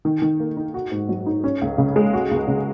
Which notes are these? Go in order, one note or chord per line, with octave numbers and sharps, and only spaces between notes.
D#3
D#3
A#3
D#4
F#4
G#2
F#3
D#4
C#4
C#2
C#3
G#3
F#4
C#2
C#3